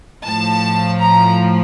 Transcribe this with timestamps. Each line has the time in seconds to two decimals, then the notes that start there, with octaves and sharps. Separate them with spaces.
0.23 A2 F3 A5
0.99 A#5